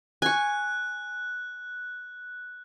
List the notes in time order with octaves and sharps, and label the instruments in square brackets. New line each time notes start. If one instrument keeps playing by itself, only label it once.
[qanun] G#5 C#6 [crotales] F#6